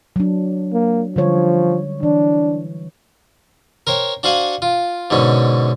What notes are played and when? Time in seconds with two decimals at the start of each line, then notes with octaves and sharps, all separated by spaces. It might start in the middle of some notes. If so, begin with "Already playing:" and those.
0.16 F#3 D4
0.73 A#3
1.16 D3 F3 G3 C#5
2.03 E3 D4
3.87 A#4 C5 C#5 G5
4.23 D4 F#4 C5 F5 F#5 G#5
4.62 F4
5.10 G#2 B2 D3 C#4